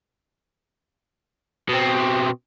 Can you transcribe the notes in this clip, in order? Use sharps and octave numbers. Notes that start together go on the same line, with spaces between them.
B2 C4